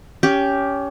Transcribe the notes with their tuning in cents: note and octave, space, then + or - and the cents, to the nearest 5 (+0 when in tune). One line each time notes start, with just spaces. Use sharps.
C#4 +20 G4 +0